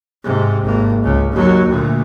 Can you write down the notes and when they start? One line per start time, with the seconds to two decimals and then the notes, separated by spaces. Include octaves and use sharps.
0.24 G#2 C3
0.63 G#1 A#3
1.03 C#2 C#3
1.32 D#2 F#3
1.68 D2 A#2